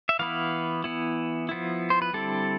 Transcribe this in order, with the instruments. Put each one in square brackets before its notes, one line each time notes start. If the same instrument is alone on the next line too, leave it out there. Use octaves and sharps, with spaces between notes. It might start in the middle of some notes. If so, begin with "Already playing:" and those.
[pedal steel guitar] E5
E3 B3 E4 F5
E3 B3 E4
F3 B3 E4
C5
B4
D3 G3 C4 E4 A4